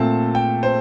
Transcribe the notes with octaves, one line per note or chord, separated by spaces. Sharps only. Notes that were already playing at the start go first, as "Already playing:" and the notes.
Already playing: A#2 A3 C4 A5
G5
C5